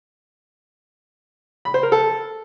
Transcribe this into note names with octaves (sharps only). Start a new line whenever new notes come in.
B5
C5
A#4
A4